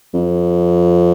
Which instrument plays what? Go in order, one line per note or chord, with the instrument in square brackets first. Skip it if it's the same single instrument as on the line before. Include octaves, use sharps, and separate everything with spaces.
[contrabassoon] F2